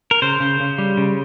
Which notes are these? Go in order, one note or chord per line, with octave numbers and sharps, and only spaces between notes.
A#4
C#3 C5
C#3
C#3
G3
C#3